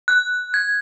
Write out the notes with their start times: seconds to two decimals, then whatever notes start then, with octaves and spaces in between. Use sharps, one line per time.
0.08 F#6
0.54 G#6